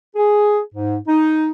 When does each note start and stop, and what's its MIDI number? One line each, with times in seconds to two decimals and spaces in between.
0.16 0.60 68
0.75 0.96 44
1.08 1.49 63